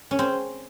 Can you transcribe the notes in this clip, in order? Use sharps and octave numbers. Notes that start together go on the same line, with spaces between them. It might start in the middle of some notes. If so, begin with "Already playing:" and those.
C#4
C4